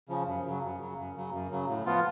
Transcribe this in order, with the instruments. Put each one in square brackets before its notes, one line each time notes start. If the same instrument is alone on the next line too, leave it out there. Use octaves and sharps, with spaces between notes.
[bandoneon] C#3 F3
F#2
C#3 F#3
F#2
C#3 F#3
F#2
C#3 F#3
F#2
C#3 F#3
A2
F3 B3 F4